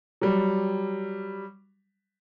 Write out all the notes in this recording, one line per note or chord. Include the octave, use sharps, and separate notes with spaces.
F#3 G3